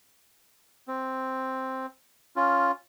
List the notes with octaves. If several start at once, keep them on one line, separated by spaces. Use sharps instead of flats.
C4
C#4 F4